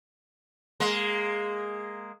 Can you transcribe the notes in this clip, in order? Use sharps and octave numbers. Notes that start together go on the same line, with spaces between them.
G#3 A#3